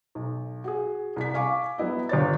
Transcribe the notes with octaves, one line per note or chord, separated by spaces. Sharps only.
B1
F#4 G#4
C2 B6
F5 G#5 C#6 D6
F#3 B3 E4 D#5
G1 C#5 A6